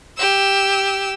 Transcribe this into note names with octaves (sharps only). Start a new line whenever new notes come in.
G4 E6